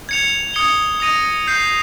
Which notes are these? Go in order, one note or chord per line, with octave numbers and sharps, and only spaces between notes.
G#6 C#7 F7
D#6 G#6 C#7 G7
D#6 A#6 D#7
G6 C7 F7